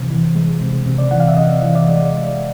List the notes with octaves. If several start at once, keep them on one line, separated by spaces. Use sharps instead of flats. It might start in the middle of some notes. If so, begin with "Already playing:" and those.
Already playing: C3 E3 C5
E3
G#3
C3
C3
D5
E3 F#5
F5
E5
C3 D#5
E3
D5
G#3